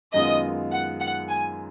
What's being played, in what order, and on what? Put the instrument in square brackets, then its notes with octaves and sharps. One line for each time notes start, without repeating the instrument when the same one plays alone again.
[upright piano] F#2 D#3 G#3 B3 F4 [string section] D#5
[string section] F#5
F#5
G#5